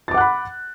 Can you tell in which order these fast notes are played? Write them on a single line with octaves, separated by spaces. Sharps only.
A6 D6 F#5 F#6 B5